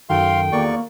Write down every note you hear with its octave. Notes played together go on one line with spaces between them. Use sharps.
F#2 D#3 F#4 A4 F5 G5 C6
E2 A#3 D5 C#6